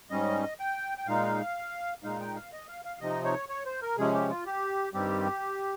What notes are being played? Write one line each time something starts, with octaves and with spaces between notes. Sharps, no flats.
G#2 G3 C#4 D#5
G5
G5
A#2 G#3 D#4 F5
A#2 G#3 D#4 F5
G5
F5
D#5
F5
F5
C3 F3 C4 D#4 D#5
C#5
C#5
C5
A#4
C3 F3 G#3 C#4 G#4
G4
F4
G4
G2 D#3 G3 C4 G4